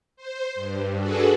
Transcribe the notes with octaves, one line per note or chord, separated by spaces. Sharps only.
C5
G2
D4 F#4 G#4 A4 B4